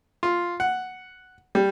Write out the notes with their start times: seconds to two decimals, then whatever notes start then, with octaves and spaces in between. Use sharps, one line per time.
0.23 F4
0.60 F#5
1.55 G3